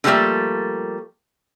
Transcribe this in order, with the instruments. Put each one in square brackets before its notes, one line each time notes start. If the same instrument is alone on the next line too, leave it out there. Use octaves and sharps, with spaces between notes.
[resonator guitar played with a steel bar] D3 F3 G3 A3 A#3